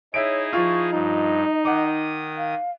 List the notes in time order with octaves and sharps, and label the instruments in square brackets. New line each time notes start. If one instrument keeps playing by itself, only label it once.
[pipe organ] D#4 E4 G#4 [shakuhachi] C#5 [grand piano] E5 D7
[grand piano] F3 F4 [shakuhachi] C#6
[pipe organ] G2 [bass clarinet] D#4 [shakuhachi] D#5
[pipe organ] D#3 D#6 [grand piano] F#5 D6
[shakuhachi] F5